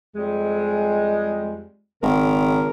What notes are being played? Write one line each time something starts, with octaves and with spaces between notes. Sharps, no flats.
F2 G3 G#3
G#1 C#3 A#4